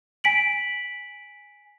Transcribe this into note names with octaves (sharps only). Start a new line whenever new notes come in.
G#5 B6 D7 F#7